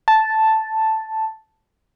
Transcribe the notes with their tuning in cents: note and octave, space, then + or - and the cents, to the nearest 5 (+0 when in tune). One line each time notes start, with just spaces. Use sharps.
A5 +0